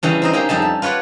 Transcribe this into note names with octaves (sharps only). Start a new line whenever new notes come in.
C#3 E3 G3 C#4
C4 D#4 D#5
A#3 C#4 D#4 G4 G#4
F2 G3 D#4 A5
E5
F4 B4 C#5 D5 F#5